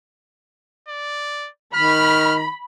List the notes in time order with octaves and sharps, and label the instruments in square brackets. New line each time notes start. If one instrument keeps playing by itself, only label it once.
[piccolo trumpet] D5
[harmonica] D#3 [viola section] B5 [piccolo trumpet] F6